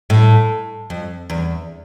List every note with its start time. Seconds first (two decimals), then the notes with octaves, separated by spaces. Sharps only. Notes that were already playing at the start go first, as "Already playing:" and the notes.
0.10 A2
0.90 F2
1.30 E2